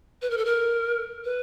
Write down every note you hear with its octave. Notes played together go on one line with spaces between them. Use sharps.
B4
A#4
A4
A#4
B4